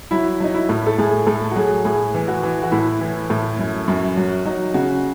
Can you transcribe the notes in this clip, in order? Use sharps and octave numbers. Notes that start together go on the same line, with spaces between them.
F#3 E4
F#3 D#4
E4
A2
A4
A2 G#4
A2 A4
F#4
F#3 G#4
A2 G#4
E3
F#4
E3
F#4
A2 E4
E3
A2
F#2
F#2
F#3
F#3 D#4
C#3 F#4